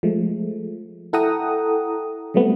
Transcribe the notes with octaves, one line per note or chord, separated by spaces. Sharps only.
F3 G#3 A3
E4 A4 F#5 G5 A#5 D#6
F#3 G3 A3 B3 C4